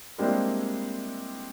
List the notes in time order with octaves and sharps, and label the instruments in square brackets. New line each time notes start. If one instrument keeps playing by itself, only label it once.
[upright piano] G3 G#3 A#3 C4 D4 E4